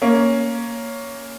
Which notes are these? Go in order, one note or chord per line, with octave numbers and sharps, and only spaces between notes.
A#3 C#4